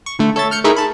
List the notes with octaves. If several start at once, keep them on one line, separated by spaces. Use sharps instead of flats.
C#6
D3 A3
A4 C#5 E5 A6
F6 G6 C#7
A3 D#4 E4 G#4 A#4 E5
A5 B5